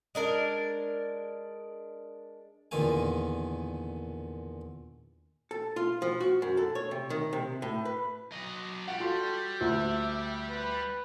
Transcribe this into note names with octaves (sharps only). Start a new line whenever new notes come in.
G#3 D4 A#4
E2 A#2 D3 D#3 F5 G#5
A4
F4
F3
F#4
F#2
A4
C#5
C3
D#3
C3
A2
B4
F#3 D#5
G3 F5 F#5
F#4 A4 C6
D2 E5
B4